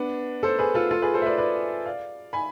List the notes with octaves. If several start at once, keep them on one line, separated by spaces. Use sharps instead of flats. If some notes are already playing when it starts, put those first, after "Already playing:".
Already playing: B3 D4
A4 C5
G#4 B4
F4 A4
F4 A4
G#4 B4
A4 C5
E5
B4 D5
B4 D5
D5 F5
G#5 B5